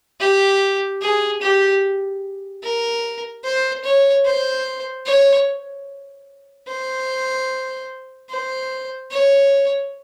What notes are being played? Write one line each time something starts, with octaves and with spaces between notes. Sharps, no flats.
G4
G#4
G4
A#4
C5
C#5
C5
C#5
C5
C5
C#5